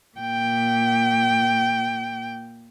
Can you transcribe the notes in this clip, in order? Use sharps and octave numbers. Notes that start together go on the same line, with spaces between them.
A#2 G5